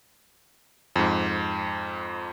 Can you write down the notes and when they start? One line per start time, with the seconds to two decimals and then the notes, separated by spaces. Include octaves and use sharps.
0.96 F2 G#2